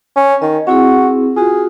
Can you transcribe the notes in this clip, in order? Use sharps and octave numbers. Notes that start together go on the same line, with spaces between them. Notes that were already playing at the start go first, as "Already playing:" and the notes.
C#4
D#3 D#5
C4 E4 F#4 G#4
F4 F#4 G#4